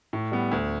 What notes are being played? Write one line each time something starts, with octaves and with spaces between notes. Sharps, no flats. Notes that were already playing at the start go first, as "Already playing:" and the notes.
A2
G3 B3
D2